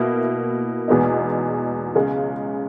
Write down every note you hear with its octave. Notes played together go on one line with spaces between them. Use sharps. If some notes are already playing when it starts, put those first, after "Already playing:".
Already playing: B2 A#3 E4
E2 B2 G#3 B3 D#4
C#2 C#3 G#3